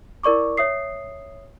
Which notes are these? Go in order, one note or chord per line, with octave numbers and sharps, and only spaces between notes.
E4 A#4 D5 C#6 D6
C#5 E5 D#6 C7